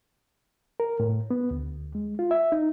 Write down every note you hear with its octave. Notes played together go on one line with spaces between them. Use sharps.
A#4
A2
B3
D2
G#3
F4
E5
D#4